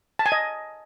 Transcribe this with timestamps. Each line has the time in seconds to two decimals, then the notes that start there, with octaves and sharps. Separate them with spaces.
0.19 A5
0.26 G#5
0.32 D#5